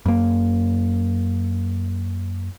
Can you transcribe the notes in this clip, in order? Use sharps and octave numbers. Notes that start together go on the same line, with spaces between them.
F#2 A#3